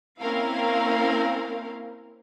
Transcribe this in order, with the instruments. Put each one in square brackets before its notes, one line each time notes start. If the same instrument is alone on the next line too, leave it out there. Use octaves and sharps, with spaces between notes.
[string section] A#3 C4 C#4 E4 A#4 F5